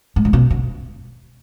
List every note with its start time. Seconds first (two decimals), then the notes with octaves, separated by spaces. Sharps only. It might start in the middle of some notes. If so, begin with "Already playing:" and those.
0.16 G#2
0.25 A2
0.33 B2
0.51 D3